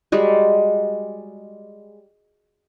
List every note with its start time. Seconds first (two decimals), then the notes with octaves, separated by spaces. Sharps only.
0.12 G3 G#3 F#4